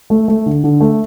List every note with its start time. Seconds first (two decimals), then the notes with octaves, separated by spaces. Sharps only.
0.10 A3
0.28 A3
0.46 D3
0.64 D3
0.81 A3